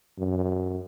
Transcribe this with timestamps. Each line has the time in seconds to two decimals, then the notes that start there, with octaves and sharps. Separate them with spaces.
0.19 F#2